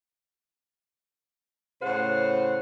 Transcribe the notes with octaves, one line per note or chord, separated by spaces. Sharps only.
A2 C#3 C5 F#5